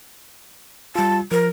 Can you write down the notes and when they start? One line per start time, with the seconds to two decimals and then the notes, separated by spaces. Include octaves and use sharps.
0.96 G3 F4 A5
1.32 F3 A#4